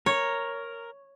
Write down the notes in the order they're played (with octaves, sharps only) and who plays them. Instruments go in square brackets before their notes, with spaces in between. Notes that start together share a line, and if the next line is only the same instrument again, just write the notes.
[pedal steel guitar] A#4 [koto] C#5